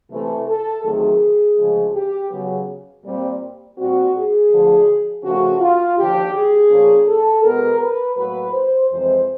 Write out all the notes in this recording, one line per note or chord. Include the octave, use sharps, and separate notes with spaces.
C3 E3 A3
A4
D2 C3 D#3 F#3 A3 G#4
D2 C#3 F3 G#3
G4
C#3 F#3 B3
A#2 G3 C4
A#2 G3 C4 F#4
G#4
D2 D3 F3
C#3 F3 A3 C#4 F#4
F4
D#2 D3 F3 G4
G#4
A#2 F3 A#3 C#4
A4
B2 G#3 B3 A#4
B4
A2 F#3 A#3 B4
C5
F2 C3 E3 G#3 C4 C5